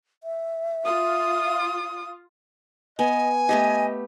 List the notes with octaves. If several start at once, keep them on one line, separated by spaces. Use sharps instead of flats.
E5
F4 D#6
B3 D#5 G#5
A3 B3 G4 D#5